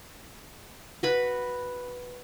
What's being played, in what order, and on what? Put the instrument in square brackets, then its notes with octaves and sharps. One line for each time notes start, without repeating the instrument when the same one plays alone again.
[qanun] F#4 B4 B5